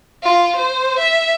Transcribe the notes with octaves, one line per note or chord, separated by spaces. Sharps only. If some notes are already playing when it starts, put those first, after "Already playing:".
F4
C5
E5